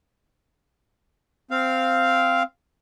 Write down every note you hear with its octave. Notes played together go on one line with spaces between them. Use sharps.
C4 F5